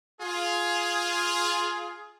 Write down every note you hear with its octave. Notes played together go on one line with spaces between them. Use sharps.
F4 G#4